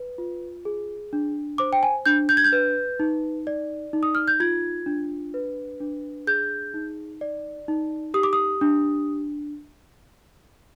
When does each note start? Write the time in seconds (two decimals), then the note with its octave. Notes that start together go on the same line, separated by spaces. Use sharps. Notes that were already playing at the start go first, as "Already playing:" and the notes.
Already playing: B4
0.18 F4
0.65 G#4
1.13 D4
1.58 C5 D6
1.73 G5
1.83 G#5
2.06 D4 G6
2.29 G6
2.37 G#6
2.44 G6
2.52 B4
3.00 D#4
3.47 D5
3.93 D#4
4.03 D#6
4.15 F6
4.28 G6
4.40 F4 G#6
4.86 D4
5.34 B4
5.80 D4
6.27 G#4 G6
6.74 D#4
7.21 D5
7.68 D#4
8.14 G4 D#6
8.23 D6
8.33 D#6
8.61 D4